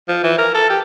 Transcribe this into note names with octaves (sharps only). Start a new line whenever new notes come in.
F3
E3
A#4
A4
G4